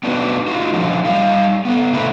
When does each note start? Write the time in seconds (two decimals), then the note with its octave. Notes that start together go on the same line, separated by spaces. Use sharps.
0.03 B3 D4 D#4 F#4 B4
0.48 D#4 F4 F#4
0.73 D3 F3 F#3 D#4
1.05 G3 D#4 F5
1.65 B3 A4
1.93 C3 D#3 A3 E4 B4